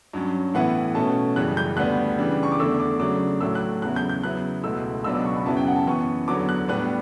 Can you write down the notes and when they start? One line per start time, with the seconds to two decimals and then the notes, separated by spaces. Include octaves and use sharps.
0.13 G2 F#3 C#4
0.54 A2 E3 B3 E4 F#5
0.95 B2 A3 C#4 A5
1.36 F#2 C#3 E3 G3 F#6
1.57 G6
1.77 D2 D3 G3 B3 F#6
2.19 C#3 E3 G3 D4
2.43 C#6
2.52 D6
2.59 E2 D3 A3 D4 E6
2.80 D6
3.00 C#3 F#3 A3 D4 D6
3.41 A2 F#3 A3 E4 E6
3.55 F#6
3.82 E2 C#3 F#3 B3 E4 F#6
3.96 G6
4.09 G6
4.23 C#3 F#3 B3 E4 F#6
4.64 C#2 B2 A3 E4 E6
5.04 C#2 B2 F#3 B3 D4 E6
5.15 D6
5.25 C#6
5.36 B5
5.45 F#2 C#3 F#3 B3 E4 A5
5.57 G5
5.67 F#5
5.76 A5
5.87 F#2 E3 B3 C#6
6.28 E2 D3 F#3 B3 D6
6.49 F#6
6.68 A2 G3 B3 D4 F#6